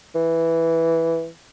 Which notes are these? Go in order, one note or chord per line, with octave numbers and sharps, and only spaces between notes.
E3